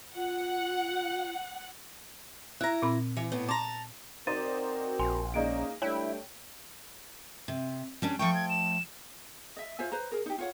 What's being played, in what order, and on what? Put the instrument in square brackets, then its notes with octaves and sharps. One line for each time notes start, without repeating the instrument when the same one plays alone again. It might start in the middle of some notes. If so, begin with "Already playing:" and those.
[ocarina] F4 [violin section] F#5
[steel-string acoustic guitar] E4 A#5 [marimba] F#6
[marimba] A#2 C4 B5
[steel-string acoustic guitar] E3
A2 B3
[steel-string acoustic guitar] A5 A#5 [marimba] C6 D6
[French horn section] C4 F#4 A#4 [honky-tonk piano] D#4 C5 D5 [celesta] A6 D#7
[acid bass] A#1 [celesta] G#5 C6
[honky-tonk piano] G#3 A#3 D#4 [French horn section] C#4 [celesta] D5 D#5 D7
[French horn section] G3 A3 D4 [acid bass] E4 [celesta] C#5 [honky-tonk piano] G5
[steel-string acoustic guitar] C3
G3 C#4 D4
[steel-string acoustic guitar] F3 A3 G5 [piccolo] C#6
[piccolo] G#6
E7
[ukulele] D#5 E5
F4 C5 E5 G#5
B4 C5 A#5
G#4 A#4
D#4 G4
F4 C#5 F#5